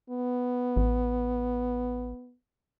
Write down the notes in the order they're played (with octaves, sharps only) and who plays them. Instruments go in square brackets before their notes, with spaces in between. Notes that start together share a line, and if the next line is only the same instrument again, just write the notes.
[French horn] B3
[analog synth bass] A1